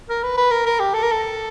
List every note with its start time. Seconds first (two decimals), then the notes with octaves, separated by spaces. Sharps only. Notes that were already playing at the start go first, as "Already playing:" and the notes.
0.09 A#4
0.23 B4
0.37 B4
0.51 A#4
0.66 A#4
0.80 G4
0.94 A4
1.03 A#4
1.12 A4